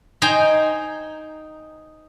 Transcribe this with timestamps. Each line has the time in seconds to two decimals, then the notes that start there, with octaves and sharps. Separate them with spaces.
0.22 D#4 C5 G5 G#5 A#5